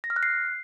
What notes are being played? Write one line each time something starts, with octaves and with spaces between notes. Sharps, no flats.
A#6
F6
F#6
C7